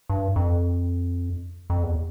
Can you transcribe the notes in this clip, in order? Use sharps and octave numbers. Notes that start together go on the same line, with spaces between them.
G2
F2
F2
E2